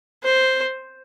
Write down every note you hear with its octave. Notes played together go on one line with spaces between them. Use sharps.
C5